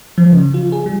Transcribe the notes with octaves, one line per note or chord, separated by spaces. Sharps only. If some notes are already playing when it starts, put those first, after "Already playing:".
F3
C#3
F4
G#4
G3